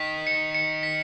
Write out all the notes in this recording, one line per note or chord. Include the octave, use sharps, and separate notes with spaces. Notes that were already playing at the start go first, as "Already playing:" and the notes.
Already playing: D#3 B6
C#7
C#7
B6